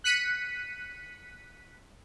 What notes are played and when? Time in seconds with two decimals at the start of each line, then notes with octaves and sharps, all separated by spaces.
0.04 F#6 B6 C#7 D#7